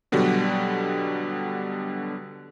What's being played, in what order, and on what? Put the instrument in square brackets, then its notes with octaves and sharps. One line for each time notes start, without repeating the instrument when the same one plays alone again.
[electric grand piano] B2 D3 F#3 G3